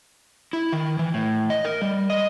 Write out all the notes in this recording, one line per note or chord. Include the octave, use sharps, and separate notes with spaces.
E4
D#3
E3
A2
D#5
A#4
G3
D#5